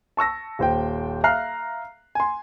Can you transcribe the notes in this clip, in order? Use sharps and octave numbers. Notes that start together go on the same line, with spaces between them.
A5 C#6 E6 A#6
D#1 C5 G5
E5 F5 A#5 F6 F#6 C7
G#5 C6